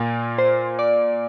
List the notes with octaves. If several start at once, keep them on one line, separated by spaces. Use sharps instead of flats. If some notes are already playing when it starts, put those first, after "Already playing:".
Already playing: A#2 A#3
C5
D5